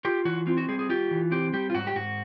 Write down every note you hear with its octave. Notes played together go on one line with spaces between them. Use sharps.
F4 G4
E3 F#4
C4 F4
F#4
G3 G#4
G#4
F4 G4
E3
C4 G4
G3 G4
F4
G#2 F#4
G4
G#2 F#4